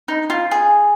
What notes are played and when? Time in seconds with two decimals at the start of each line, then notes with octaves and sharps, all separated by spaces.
0.08 D#4
0.30 F4
0.51 G#4